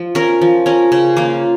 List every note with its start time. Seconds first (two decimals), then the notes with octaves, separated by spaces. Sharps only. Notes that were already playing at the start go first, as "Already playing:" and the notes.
Already playing: F3
0.15 C#4 A#4
0.41 F3
0.66 C#4 A#4
0.92 C#3
1.17 A#3 F4